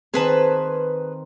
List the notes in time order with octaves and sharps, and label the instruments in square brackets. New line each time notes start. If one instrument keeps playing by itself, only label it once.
[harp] D#3 C4 [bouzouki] G#4 B4 A5